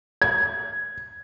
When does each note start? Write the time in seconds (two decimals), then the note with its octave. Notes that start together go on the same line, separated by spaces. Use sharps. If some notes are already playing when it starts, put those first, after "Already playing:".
0.22 G#6